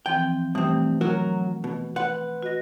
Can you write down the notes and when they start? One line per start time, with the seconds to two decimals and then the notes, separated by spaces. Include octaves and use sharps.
0.06 E3 F3 C4 G5
0.55 G2 B2 E3 A3 C4
1.01 F#3 F#4 A#4
1.64 B2
1.96 B4 F#5 C6
2.43 F#4 D#5 A#6